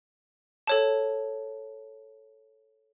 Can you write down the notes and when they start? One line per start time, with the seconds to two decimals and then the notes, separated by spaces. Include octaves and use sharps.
0.67 A4 C#5 A5